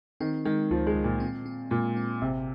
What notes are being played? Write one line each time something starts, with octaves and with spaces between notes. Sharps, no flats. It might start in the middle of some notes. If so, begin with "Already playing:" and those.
D#3 C4
D#3 G#3
C#2 F3
G#3
C#2
A#2
C4
C4
A#2 G#3
C4
G#1 C3